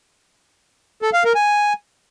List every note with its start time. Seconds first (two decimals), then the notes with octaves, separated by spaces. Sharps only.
1.02 A4
1.13 F5
1.24 A#4
1.35 G#5